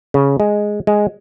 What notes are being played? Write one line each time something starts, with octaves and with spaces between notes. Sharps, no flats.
C#3
G#3
G#3